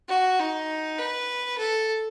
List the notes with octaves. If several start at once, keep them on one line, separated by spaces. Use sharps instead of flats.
F#4
D#4
B4
A4